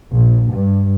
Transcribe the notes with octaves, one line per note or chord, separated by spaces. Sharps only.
A#1
G2